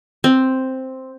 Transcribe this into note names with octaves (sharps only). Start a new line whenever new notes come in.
C4